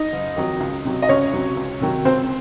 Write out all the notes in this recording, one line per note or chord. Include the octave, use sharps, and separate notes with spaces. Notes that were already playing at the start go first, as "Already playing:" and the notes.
Already playing: D#4 D#5
F#1
F2 D#3 F#3
C#2
C3 F#3
D#5
C#2 C#4 C#5
C3 F#3
C#2
C3 D#3 F#3
C#2 C4 C5